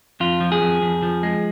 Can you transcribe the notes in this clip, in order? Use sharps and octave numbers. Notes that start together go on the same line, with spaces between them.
F2 F4
F3
G#4
F2
F2
F3
G#3